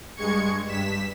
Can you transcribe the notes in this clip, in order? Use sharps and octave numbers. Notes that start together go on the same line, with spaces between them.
G2 G#3 C#6 G#6 C#7
G2 B6 E7